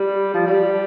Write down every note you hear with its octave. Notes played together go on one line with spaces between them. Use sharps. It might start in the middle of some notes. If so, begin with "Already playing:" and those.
Already playing: G3
F3
G3